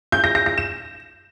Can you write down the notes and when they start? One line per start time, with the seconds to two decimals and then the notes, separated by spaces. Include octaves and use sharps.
0.12 G6
0.24 A#6
0.35 A#6
0.46 A#6
0.58 E7